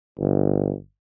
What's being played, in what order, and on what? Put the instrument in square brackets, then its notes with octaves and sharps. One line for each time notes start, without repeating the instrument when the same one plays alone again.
[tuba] G1